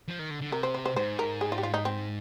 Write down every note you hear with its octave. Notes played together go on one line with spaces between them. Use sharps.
F3
D#3
D3
D3
C3 A#4
C5
C5
C5
G#2 C5
A#4
G#4
F4
G4
F4
D#4
C4